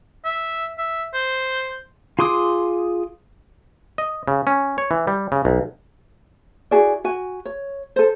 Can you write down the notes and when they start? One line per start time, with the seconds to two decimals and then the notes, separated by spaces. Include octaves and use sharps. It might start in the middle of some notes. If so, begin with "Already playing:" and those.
0.25 E5
0.78 E5
1.14 C5
2.19 F4 G#4 C6 D6 D#6
3.98 D#5
4.28 C#3
4.47 C#4
4.78 C#5
4.91 E3
5.07 G3
5.32 C#3
5.45 B1
6.71 E4 F#4 G#4 D5
7.04 F#4 G#5
7.45 C#5
7.96 A4 C5